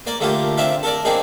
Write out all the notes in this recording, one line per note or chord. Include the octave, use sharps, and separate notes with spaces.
A#3 D5
D3 A3 A#3 F4 G4
C4 D4 F4 E5 F5
A4 A#4 D5
A#3 C4 D4 D#4 G#4